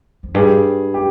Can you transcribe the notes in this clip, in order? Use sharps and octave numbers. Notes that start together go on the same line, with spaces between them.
F2
G2 G#4
G4